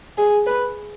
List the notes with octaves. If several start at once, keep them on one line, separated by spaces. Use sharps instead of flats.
G#4
B4